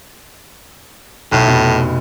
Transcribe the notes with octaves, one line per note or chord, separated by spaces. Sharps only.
B1 A2 F#6
F1 B2